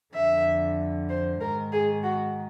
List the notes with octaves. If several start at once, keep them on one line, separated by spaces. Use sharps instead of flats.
F2 D3 E5
C5
G#2 D#3 A#4
G#4
F#4